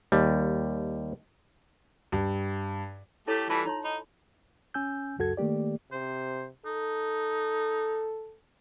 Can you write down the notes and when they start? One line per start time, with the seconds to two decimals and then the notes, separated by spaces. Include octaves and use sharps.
0.12 D#2 G3
2.12 G2
3.28 A3 E4 G4 A4 C#5
3.50 E3 G3 F4 B4 A5
3.65 D#4 C#5 A#5 C6
3.84 D#4 B5
4.74 C#4 G#5 E6 G6
5.19 C#2 F#2 F#4 A4 G#6
5.37 D#3 A3 A#3 G4 D5
5.92 C3 C5
6.66 D#4 A4